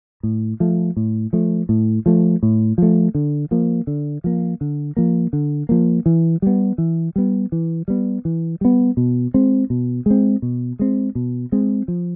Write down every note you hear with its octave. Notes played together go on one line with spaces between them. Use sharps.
A2
F3 A3
A2
F3 A3
A2
F3 A3
A2
F3 A3
D3
F3 A#3
D3
F3 A#3
D3
F3 A#3
D3
F3 A#3
E3
G3 B3
E3
G3 B3
E3
G3 B3
E3
G3 B3
B2
G#3 C4
B2
G#3 C4
B2
G#3 C4
B2
G#3 C4
F3